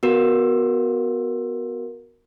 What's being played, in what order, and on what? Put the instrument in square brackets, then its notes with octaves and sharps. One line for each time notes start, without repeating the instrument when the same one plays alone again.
[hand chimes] B3 F#4 A#4